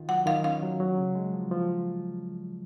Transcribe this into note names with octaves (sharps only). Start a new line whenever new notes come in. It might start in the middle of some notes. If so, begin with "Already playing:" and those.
Already playing: D#3 F4
F#3 F#5
D#3 F5
C#4 F5
F#3
F#3
C#3
G#3
F3
F3